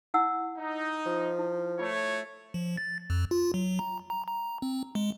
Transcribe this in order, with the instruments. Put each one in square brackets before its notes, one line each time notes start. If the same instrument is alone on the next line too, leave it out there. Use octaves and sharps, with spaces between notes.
[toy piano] E4 F#5 E6
[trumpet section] D#4
[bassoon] F3
[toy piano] E4
[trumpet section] A3 C#5 [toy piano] F4
[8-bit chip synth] F3
A6
F2
F4
F#3
A#5
A#5
A#5
C4
G#3